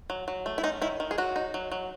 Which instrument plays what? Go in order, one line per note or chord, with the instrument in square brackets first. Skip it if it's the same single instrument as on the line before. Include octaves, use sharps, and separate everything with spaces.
[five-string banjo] F#3
F#3
A3
E4
C#4 D#4
D#3 E4
D#3
G#4
F#3 F#4
D#4
F#3
F#3